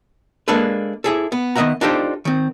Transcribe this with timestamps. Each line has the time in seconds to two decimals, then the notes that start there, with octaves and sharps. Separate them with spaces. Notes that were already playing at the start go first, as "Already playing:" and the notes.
0.48 G#3 A#3 D4 A4 B4
1.04 E4 G#4 A4
1.32 B3
1.56 D#3 B3 D#5 E5 F#5 A#5
1.81 D4 D#4 F4 G4 A4 C5
2.25 D#3 C4